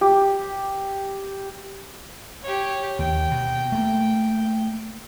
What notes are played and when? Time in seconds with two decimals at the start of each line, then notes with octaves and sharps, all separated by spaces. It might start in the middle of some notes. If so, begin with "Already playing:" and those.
0.01 G4
2.43 G4 C#5
2.99 D#2 G5
3.31 B2
3.72 A3 A#3